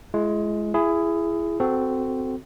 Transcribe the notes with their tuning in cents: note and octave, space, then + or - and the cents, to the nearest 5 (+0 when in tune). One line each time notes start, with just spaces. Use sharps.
G#3 +20 E4 +45
E4 +25 G#4 +0
C4 -15 F#4 +0 A4 +0